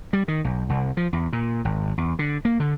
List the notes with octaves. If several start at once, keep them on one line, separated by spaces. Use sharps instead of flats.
G3
D#3
B1
C2
F3
E2
A#2
G#1
E2
D3
A#3
D3